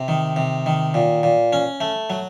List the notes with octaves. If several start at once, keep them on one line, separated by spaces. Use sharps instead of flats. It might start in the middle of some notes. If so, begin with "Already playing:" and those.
Already playing: C3
D#3
C3
D#3
A#2
A#2
C#4
A3
F#3